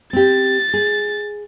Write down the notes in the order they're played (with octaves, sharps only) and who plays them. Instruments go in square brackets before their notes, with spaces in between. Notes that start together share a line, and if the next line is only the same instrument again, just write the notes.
[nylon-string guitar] C4 G4 [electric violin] A6
[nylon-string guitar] G#4